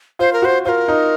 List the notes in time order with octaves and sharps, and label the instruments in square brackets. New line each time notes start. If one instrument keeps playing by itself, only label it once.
[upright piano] F4 [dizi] C5
[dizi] A#4
[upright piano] F#4
[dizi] C5
[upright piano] F4 [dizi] C5
[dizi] A#4
[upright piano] D#4